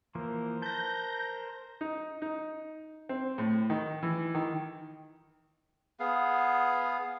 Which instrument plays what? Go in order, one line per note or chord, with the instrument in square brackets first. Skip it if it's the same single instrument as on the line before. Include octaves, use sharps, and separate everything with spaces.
[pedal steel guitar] E3 F3 A#3 [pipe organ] A#4 C5
[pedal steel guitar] B4 A5 [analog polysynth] G6 A#6
[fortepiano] D#4
D#4
C4
A2
D#3
E3
D#3
[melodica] B3 G#4 F5